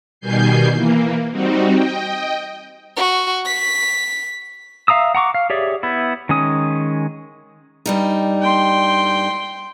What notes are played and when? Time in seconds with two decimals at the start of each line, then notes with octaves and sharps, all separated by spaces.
0.20 B2 D#3 G3 G#5 G6 C7
0.72 E3 A#3
1.31 G3 C4 D#4 F#4
1.72 D#5 G5
2.96 F#4
3.45 B6
4.88 E5 F5 A#5 D#6 E6
5.15 F#5 A#5 C#6 D6
5.34 F5
5.50 G4 G#4 C#5 D5 E5
5.83 B3 E4
6.29 D#3 G#3 C#4 D#6
7.86 G2 G3 D#4
8.42 G5 C6